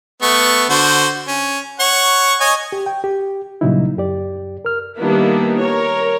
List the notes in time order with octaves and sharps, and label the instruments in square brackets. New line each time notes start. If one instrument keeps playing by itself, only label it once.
[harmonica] A3 B3 C#6
D3 F#4 C5
C#4
C#5 F#5 C#6
C#5 D#5 G#5
[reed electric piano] G4
G5
G4
A#2 C#3 F#3 G3 D#4 E4
F#2 G4 D5
A#4 F6
[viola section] D#3 G3 A#3 B3 D4 E4
A#4 C#5